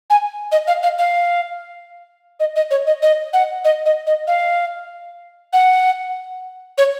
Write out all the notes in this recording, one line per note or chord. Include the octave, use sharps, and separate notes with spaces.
G#5
D#5
F5
F5
F5
D#5
D#5
C#5
D#5
D#5
F#5
D#5
D#5
D#5
F5
F#5
C#5